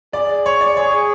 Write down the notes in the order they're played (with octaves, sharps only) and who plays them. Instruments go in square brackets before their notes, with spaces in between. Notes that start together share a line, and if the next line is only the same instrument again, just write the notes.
[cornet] G#4 [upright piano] D5
[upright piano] C#5
D5
[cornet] G#4 [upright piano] C#5